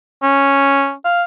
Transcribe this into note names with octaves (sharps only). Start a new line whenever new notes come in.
C#4
F5